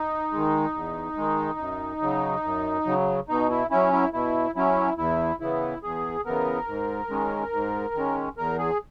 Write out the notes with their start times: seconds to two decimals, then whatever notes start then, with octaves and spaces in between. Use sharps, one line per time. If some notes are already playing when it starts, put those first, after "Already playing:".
Already playing: D#4
0.32 D#3 G#3
0.75 E2
1.17 D#3 G#3
1.59 F#2
2.02 C#3 F#3
2.44 F#2
2.86 C#3 F#3
3.28 B2 D#4
3.50 E4
3.71 F#3 C#4 E4
3.93 E4
4.13 B2 E4
4.55 F#3 C#4 E4
4.98 E2 E4
5.40 C#3 E3 B3 E4
5.83 E2 G#4
6.25 C#3 E3 B3 A#4
6.68 G#2
7.10 D#3 G#3 C#4
7.52 G#2
7.94 D#3 G#3 C#4
8.37 E2 A#4
8.59 G#4